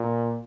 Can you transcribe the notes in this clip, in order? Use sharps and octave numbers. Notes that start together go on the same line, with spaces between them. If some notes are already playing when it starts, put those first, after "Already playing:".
Already playing: A#2